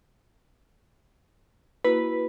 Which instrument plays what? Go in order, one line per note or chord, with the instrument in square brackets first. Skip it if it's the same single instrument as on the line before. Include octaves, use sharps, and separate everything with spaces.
[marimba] A#3 E4 F#4 [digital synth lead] B4